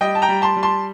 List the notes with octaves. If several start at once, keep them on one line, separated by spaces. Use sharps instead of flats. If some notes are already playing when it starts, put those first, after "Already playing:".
G3 D#5 G5
A5
G5 A#5
G3
A5 C6
G3
A5 C6